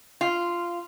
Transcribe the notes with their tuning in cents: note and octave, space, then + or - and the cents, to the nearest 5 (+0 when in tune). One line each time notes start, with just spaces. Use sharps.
F4 -10